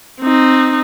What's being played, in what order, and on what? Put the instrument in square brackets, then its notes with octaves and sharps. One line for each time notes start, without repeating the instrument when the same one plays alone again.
[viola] C4 D#4